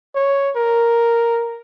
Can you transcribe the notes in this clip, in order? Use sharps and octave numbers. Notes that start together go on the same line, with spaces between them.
C#5
A#4